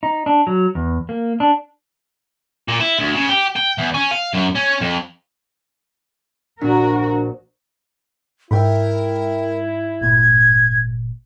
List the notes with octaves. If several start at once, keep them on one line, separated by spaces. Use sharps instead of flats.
D#4
D4
F#3
E2
A#3
D4
A#2
E4
D2
C#3
G4
G5
E2
C#4
F5
F#2
C#4
F2
A#1 D4 F#4 A#4
G#2 E4 A#4 E5 G5 B5
G1 A#2 G#6